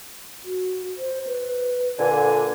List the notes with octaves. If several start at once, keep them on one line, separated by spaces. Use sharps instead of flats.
F#4
C5
B4
A#2 D3 G#5